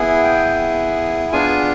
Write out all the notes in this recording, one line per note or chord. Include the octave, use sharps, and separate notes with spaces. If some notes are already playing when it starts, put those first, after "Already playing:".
Already playing: B3 E4 G#4
G5
B3 D4 F4 G#4 G#5